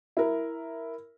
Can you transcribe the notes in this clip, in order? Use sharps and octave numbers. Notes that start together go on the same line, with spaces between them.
E4 A#4